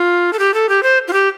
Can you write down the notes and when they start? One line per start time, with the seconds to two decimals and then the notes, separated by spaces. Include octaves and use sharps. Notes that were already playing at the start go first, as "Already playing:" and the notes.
Already playing: F4
0.33 A4
0.39 G4
0.54 A4
0.69 G4
0.83 C5
1.08 F4
1.13 G4